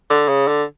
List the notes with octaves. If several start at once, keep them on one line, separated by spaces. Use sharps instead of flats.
D3
C#3
D3